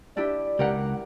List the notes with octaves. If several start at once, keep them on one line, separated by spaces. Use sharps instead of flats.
D4 E4 G4 D5
C#2 G4 A#4 F#5